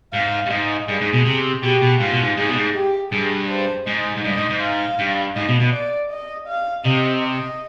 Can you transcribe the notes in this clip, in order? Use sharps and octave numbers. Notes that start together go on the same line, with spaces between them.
G#2 F5
G2
G#2 D#5
G2 G#4
G#2
B2
C3
B2 G4
B2
G#2 F4
B2
G#2
G#2 G#4
B2
G#2
G4
G2 G#4
C5
G#2 D#5
G#2
G2 D#5
G#2
G#2
F5
G2
G#2 D#5
B2
B2
D5
D#5
F5
C3 D#5
D#5